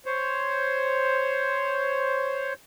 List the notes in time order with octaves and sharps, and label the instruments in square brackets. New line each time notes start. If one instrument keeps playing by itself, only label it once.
[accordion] C5 C#5